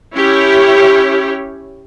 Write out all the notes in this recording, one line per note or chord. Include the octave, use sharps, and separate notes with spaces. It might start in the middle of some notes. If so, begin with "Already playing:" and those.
C#4 E4 G4 C#5